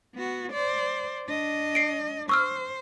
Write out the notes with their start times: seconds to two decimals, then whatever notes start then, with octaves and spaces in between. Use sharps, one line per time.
0.15 B3 F#4
0.52 C5 D5
1.25 D4 D#5
1.75 C7 D7
2.29 C5 C#6 E6 F6